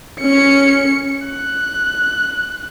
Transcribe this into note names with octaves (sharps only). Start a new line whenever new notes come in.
C#4 C#7
F#6